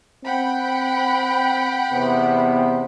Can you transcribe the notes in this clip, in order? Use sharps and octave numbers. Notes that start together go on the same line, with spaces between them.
C4 F#5 G5 B5
E2 C3 B3